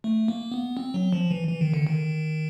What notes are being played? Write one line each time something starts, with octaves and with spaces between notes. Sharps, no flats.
A3
A#3
B3
C4
F#3
F3
E3
E3
D#3
D3
D#3